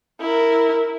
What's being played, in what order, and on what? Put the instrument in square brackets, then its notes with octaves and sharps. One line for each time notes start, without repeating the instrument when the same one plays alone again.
[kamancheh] E4 A#4